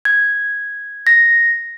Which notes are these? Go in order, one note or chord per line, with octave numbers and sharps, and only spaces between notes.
G#6
A#6